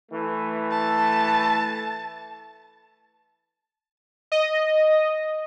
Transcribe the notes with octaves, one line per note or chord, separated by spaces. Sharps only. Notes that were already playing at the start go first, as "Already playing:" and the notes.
E3 A3
A5
D#5